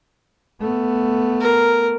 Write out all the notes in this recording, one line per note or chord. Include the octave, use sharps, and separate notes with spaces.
A3 B3
A#4